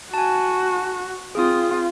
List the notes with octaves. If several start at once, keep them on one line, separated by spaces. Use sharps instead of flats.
F#4 G#5 A5
C4 F4 G#4 D#6